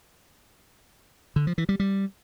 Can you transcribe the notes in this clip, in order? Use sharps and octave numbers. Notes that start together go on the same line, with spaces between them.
D3
F3
E3
G3
G3